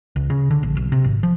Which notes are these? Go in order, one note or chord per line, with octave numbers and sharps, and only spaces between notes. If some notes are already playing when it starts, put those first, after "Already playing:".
C#2
C#3
D3
A#1
B1
C3
G#1
F3